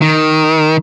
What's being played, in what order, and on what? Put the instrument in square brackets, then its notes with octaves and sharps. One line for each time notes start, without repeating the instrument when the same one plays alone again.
[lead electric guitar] D#3